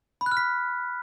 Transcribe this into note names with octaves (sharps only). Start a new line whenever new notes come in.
B5
F#6
F6
B6